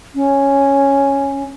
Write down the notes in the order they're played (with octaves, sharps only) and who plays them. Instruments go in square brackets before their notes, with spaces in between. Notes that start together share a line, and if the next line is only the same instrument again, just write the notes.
[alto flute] C#4